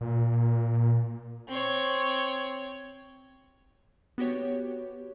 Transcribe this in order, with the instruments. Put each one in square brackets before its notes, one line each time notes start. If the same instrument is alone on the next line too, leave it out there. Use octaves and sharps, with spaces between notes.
[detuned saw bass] A#2
[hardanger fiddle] C4 C#5
[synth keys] B3 F#4 G4 C#5